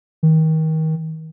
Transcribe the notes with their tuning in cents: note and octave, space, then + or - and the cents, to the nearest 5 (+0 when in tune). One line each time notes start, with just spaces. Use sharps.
D#3 +30